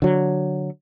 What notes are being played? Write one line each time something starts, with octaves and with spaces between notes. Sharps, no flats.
D3 F#3